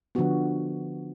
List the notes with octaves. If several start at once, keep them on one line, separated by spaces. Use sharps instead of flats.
D3 F3 B3 F#4